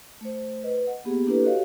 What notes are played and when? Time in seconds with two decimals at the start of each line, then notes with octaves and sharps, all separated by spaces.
0.21 A3 C5
0.63 B4 D#5
0.87 F#5
1.04 A#3 B3 G4 G#4
1.26 A#3 D4 E4 G4 A4 B4
1.44 F#4 G4 C#5 D#5 F5